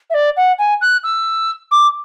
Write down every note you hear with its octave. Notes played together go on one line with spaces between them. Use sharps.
E5
D5
F#5
G#5
F#6
E6
D6